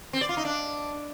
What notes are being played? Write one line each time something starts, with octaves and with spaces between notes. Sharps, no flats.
C4
D5
F4
D#4
D4